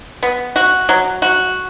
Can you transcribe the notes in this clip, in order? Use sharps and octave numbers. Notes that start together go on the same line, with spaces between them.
B3
F#4
F#3
F#4